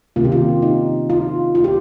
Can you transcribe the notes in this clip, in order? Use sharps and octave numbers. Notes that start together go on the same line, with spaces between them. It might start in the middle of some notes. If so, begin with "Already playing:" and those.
C3 D#3 A#3 C#4 F4
G4
F4
D#4
F4
F4
G4